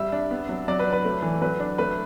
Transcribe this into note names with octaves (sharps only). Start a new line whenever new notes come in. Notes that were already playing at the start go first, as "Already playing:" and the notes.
Already playing: G3 E5
D4
B3
F#3
F#3 D5
B4
D4
B4
A3
E3
F#3 B4
D4
A3 B4